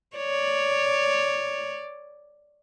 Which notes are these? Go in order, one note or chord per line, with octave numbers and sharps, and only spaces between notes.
C#5 D5